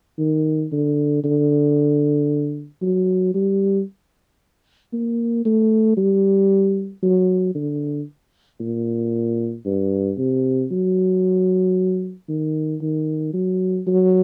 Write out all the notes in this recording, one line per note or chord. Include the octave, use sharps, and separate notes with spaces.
D#3
D3
D3
F#3
G3
A#3
A3
G3
F#3
D3
A#2
G2
C3
F#3
D#3
D#3
F#3
F#3